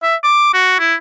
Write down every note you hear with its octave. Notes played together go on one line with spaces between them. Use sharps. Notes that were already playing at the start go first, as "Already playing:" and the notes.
E5
D6
F#4
E4